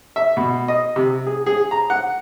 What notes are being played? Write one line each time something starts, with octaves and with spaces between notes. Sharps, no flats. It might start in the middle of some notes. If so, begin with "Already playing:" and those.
E5
B2
D#5
C3
G#4
G#4
A#5
F#5